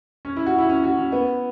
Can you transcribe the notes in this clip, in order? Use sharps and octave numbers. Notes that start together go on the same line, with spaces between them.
C#4
E4
F#4
E4
C#4
F#4
C#4
B3